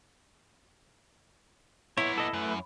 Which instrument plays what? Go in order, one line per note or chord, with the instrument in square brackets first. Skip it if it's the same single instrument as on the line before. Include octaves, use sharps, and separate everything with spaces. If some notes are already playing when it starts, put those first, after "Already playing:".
[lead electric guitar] A#2 B3 [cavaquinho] E4 [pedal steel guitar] C#5
[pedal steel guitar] A4 D#5
[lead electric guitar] F#2 [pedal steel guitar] A3 B4